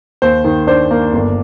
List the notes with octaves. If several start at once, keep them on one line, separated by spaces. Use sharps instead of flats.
D#2 C5
D#3
D4 C5
A#3
G1